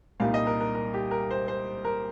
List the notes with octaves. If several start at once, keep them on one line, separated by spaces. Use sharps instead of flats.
C2 A#2 G3 A#3 D#4 F5
D#5
A#4
A#4
A#4
G4
A#4
C5
C5
A#4